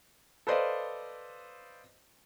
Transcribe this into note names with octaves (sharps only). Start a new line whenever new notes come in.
A4 B4 C5 D5 D#5 F5